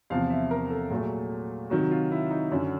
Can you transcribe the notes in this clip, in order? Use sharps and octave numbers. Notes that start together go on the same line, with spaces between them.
E2 C3 F3 F5
E5
A#4
A4
A#2 F#3 A3 G#4
C3 D#3 F#3 F#4
F4
E4
D#4
F#2 D3 F#3 C#4